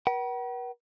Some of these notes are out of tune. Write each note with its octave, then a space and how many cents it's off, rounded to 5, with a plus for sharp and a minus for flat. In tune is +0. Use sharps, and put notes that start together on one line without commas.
B4 -45 F#5 +45